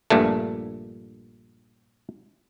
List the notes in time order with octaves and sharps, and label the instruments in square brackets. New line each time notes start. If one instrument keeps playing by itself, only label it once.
[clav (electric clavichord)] A#1 G2 A#2 A3